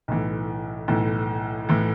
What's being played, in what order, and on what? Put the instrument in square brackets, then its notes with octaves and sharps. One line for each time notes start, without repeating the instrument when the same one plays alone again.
[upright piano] B1 A2 E3
B1 A2 E3
A2 E3